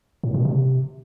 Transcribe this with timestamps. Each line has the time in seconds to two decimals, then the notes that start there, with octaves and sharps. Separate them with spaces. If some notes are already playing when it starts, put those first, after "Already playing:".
0.24 A2
0.34 B2
0.45 C3